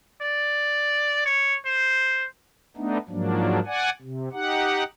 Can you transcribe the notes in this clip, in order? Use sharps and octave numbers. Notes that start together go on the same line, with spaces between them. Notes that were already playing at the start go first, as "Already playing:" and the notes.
D5
C#5
C5
A3 B3 D4 D#4
G#2 F3 F#3 A#3 D4
D5 F#5 G#5
C3
D#4 G4 F#5